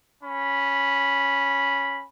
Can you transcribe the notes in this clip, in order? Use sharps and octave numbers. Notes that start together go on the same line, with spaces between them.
C#4 B5